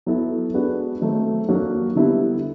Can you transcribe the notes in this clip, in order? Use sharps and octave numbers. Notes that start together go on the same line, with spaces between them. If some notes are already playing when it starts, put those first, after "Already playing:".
F#3 B3 E4 A4
G#3 B3 D4 F#4 B4
D#3 F#3 A3 C4 D#4
F#3 A#3 D4 F#4
D3 G3 B3 E4